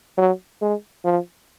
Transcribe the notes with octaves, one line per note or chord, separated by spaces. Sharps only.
F#3
G#3
F3